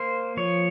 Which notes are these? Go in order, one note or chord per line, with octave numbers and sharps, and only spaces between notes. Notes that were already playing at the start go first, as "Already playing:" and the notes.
Already playing: A#3 C5
F3 C#5